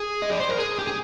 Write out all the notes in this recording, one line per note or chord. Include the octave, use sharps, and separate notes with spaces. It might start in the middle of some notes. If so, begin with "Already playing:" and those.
Already playing: G#4
D#5
D5
C5
A#4
G#4
G4
G#4